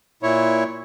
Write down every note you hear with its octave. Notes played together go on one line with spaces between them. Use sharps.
A#2 E4 C#5